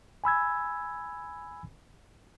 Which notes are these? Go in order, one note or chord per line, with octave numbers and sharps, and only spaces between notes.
G#5 B5 E6 G#6